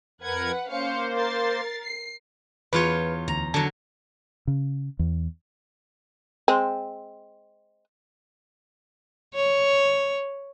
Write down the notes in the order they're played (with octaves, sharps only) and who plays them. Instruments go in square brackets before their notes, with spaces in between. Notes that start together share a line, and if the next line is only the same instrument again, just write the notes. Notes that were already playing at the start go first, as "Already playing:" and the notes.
[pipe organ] F2 A#4 G#6 [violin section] B4 F#5
[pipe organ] A#3 C5 [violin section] C#4 F5 C#7
[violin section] A#4 A6 C7
C7
[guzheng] E2 F4 C#5 [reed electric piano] B4
[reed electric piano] D2 [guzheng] A#5
[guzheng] D3 F#3 [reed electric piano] A5
[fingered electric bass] C#3
E2
[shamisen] G#3 C4
[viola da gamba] C#5